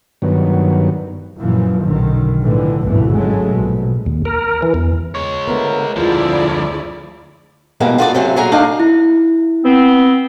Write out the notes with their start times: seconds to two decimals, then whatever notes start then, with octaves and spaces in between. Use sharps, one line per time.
0.22 G2 D#3 F#3 B3
1.39 F#2 A#2 E3 F3
1.84 B1 F#2 D3 D#3
2.43 A2 D3 E3 F3
2.83 G#1 D2 G2 B2 D3 E3
3.13 G#2 C#3 F#3 G#3 A3
3.56 A#1 B2
4.06 D#2
4.25 A#4
4.62 E3
4.74 E2
5.15 G#3 C#5
5.48 D3 A3 B3 A#4
5.96 D2 D3 F3 E4 F4 G#4 A#4 D5
7.80 E2 G#2 B2 G3 G#3 A#3
7.98 F4 F#4 G#4 A4 C5 D5
8.14 C3 F#3 A3 C#4 F4 F#4
8.36 A#2 F#3 G#4 G#5 A#5
8.52 A3 D4 D#4 G#4 F5
8.80 E4
9.65 B3 C4